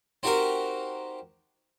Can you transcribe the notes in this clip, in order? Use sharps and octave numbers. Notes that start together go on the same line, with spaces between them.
C4 D#4 F#4 G4 A#4 C5